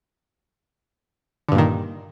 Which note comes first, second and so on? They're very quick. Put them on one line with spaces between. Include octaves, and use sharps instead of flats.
D3 G2 A#2 D#3